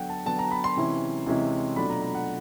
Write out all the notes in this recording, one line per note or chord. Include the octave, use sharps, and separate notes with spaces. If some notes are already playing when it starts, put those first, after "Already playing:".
Already playing: D3 F#3 B3 F#5 G5
A5
D3 F#3 B3 A5
A#5
B5
C6
C3 E3 G#3 C#4 E4
C3 E3 G#3 C#4 E4
B2 F#3 A3 D4 F4 B5
A#5
A#5
F#5